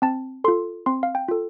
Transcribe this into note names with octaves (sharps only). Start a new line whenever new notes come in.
C4 A5
F4 A4 C6
C4 C6
F5
G5
F4 A4